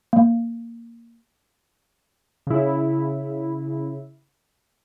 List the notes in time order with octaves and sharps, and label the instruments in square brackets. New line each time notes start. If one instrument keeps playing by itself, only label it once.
[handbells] A#3
[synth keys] C#3 E4